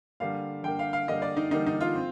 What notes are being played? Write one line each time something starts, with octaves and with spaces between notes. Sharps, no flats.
D3 G3 A#3 F5
D3 G3 A#3 G5
F5
F5
D3 G3 A#3 D#5
D5
D#4
D3 G3 A#3 D#4
D#4
F4
C4